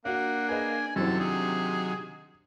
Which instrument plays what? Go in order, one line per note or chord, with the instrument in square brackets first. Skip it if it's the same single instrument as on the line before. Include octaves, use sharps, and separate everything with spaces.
[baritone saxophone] A#3 [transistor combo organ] D4 [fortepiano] F#4 F5 [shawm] F#5
[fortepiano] G#4 B4 D#5 [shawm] G#5
[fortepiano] F#2 E3 C4 [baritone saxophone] C3 [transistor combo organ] D#3 F#3 [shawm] A4
[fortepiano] D4 [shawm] G#4